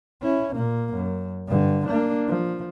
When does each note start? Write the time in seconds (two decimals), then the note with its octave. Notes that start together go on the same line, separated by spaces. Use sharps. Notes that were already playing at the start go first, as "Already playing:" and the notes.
0.22 C#4 E4
0.55 A#2 A#3
0.95 F#2
1.48 G2 D3
1.87 A#3 D4
2.28 F3